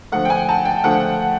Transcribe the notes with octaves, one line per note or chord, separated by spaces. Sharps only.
D3 F3 A3 F#5
G5
G#5
A5
G5
D3 F3 A3 F#5